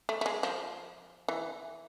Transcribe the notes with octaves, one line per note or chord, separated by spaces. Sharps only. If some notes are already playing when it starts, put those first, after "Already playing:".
A3
A3
G#3
F3
E3